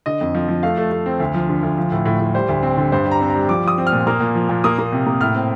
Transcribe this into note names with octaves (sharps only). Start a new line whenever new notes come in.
D3 D#5
F2
F3
F3
A3 F5
A3
A3
C4
D2
F3
D3
D2
F3
A2
A2
A2
G3 C5
D2
C4
D3
G2 C5
G3
A#5
C4
G3 A#5
F3 D6
F3 D#6
C4
F6
A#2
A#3 F6
A#2
F3
A#2
A#3 D#6
A#3
C3
A#3
A2 F6
C4